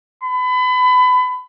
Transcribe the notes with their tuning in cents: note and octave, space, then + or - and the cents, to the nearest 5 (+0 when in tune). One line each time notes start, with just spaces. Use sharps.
B5 +30